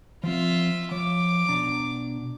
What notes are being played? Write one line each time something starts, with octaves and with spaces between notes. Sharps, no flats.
F3 C4 F4 E5
F3 C#5 D6
B2 D4 A#5